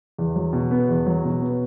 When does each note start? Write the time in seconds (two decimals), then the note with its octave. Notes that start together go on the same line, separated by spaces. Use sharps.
0.18 E2
0.36 F#3
0.53 B2
0.71 B3
0.89 E2
1.06 F#3
1.24 B2
1.42 B3